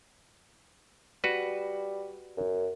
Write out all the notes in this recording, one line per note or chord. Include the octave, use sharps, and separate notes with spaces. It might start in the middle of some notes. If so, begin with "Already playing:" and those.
G3 F#4 B4
F#2